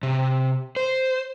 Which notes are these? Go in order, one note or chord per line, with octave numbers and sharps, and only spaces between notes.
C3
C5